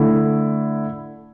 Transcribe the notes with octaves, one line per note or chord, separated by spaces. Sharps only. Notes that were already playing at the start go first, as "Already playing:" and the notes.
Already playing: D3 A3 E4